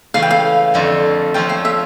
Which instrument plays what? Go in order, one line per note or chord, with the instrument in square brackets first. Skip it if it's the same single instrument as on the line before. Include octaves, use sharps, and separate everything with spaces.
[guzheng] C#3 E3 A3 C#4 [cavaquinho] F5
[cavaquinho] G5
F5
[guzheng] F2 D3 A3 C#4 F4
[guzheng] F3 A3 C#4 F4 [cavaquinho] G5
[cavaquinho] F5
E5